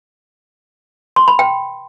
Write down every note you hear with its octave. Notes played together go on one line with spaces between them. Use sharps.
C6
B5
G5